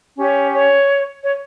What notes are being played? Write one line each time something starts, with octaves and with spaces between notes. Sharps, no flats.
C#4 G4 C#5
C#5
C#5